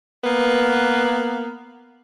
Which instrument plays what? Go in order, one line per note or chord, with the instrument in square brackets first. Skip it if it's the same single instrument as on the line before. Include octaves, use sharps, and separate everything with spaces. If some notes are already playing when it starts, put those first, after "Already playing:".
[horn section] A#3 B3